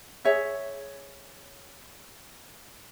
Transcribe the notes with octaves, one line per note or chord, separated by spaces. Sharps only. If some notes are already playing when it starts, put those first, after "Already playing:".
G#4 C#5 E5